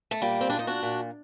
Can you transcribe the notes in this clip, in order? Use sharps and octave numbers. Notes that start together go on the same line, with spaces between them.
A3
A#2 G3 A#3
C4
A#2 D4
D#4
D4 F#4
A#2